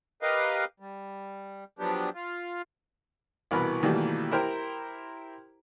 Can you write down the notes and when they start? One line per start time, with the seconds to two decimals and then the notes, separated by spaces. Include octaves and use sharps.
0.22 G4 A#4 B4 D#5 F5
0.80 G3
1.79 F3 F#3 B3 D4 G4
2.15 F4
3.51 C2 B2 E3 A#4 B4 B5
3.83 B2 D#3 E3 G3 A3 A#3
4.32 E4 G4 A#4 C5 G5 A#5